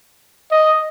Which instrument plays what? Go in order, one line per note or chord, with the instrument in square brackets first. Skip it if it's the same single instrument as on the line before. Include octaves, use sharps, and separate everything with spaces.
[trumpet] D#5